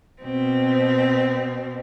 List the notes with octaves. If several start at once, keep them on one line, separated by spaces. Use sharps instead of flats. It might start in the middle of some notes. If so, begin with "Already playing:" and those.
B2 C4